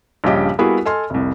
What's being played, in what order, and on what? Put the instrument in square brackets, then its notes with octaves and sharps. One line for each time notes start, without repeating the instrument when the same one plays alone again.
[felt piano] A#1 G2 C#3 G4 D#5
G3 A#3 B3 E4 F#4 G#4
A4 D#5 G#5 C6 F6
F1 C2